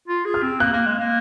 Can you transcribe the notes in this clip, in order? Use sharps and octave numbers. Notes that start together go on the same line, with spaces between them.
F4
G#4
F6
C4
A#3 F#6
A#3
G#3
A#3